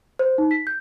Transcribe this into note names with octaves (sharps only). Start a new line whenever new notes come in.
C5
D#4
B6
G6